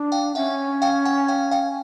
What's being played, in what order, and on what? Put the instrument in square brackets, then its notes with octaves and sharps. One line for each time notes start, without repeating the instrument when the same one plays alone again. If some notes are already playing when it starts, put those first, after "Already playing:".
Already playing: [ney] D4
[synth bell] F5 G5
[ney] C#4 [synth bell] E5 F#5
[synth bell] F5 G5
F#5 G#5
F5 G5
F5 G5